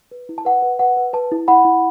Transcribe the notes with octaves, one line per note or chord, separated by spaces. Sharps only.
B4
E4
A5
B4 F#5
B4
B4 F#5
B4
B4 A5
E4
E4 F#5 B5
E4